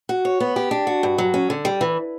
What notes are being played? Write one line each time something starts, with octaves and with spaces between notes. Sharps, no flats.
F#4
C#5
B3
G4
D4
F#4
G2
F#3
C#4
D3
G3
E3